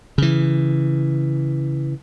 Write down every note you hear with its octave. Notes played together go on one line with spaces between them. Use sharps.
C#3 E3